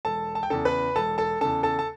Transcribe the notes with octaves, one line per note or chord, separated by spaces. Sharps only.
E1 A4 A5
A5
G5
E2 C#3 A4 A5
B4 B5
E1 A4 A5
A4 A5
E2 C#3 A4 A5
A4 A5
A5